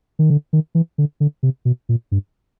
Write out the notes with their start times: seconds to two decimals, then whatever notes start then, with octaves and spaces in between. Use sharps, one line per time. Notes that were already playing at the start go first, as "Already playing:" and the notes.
0.19 D#3
0.30 D3
0.53 D#3
0.75 E3
0.98 D3
1.20 D3
1.43 C3
1.65 B2
1.89 A#2
2.12 G2